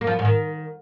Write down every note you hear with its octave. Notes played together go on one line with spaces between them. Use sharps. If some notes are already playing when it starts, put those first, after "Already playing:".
A#3
F3
B3
G#2
D#3